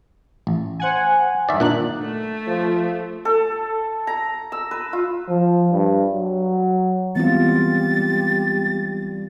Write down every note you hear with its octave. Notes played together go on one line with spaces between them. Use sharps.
A1
C5 F#5 G#5
G2 D#3 D5 E5
A#2 D4 D#4 F#6
A3
F3
A4
A#5
E6
B4
F4
F3
G2
F#3
E3 G3 G#3 B3 C4 F4 A6